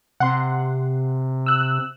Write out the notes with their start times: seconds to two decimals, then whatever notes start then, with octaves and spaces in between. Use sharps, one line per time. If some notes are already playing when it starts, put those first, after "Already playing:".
0.20 C3 F#5 C6
1.46 E6 F#6